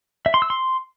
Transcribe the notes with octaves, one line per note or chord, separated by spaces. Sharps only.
E5
C6
E6
C6